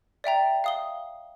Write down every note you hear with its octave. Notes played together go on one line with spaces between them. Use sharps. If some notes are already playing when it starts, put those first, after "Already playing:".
D5 E5 G5 A#5
F5 D#6 G7